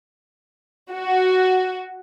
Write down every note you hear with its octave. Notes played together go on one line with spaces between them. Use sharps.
F#4